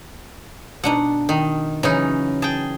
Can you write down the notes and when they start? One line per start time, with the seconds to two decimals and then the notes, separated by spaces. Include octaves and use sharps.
0.84 B2 D4 D#4 F#5
1.29 D#3
1.83 C#3 E3 F#3 C#4 D#4
2.42 G#4 G5 A5